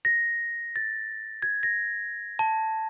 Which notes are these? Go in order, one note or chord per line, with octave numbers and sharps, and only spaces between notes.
A#6
A6
G#6
A#6
A5